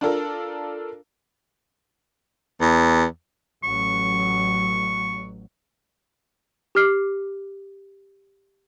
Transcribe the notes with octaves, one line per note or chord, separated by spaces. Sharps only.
D4 F4 A4 A#4
E2
A1 F#3 C#6
G4 D6 F6 C7